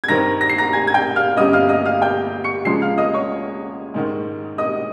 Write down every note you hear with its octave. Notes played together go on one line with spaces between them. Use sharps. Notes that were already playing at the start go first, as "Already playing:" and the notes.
G#6
G2 D#3 G3 C4 A#5 A#6
A#6
C7
A#5 A#6
G#5 G#6
G#6
G5 G6
F5 F6
G1 G2 G3 C#4 D#5 D#6
F5 F6
D#5 D#6
F5 F6
G5 G6
C#6 C#7
C#2 C#3 F3 G#3 C6 C7
F5 F6
D#5 D#6
C#5 C#6
G#2 D#3 G#3
D#5 D#6